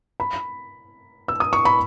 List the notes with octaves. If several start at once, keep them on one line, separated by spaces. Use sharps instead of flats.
B5
E6
D#6
C#6
B5